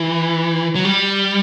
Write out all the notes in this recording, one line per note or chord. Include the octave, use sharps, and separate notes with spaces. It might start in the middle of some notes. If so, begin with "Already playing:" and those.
Already playing: E3
F#3
G3